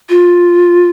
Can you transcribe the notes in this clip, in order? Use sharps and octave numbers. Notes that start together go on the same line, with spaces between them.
F4